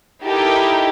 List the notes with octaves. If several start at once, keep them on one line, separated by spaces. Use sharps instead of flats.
D#4 E4 G4 A4 A#4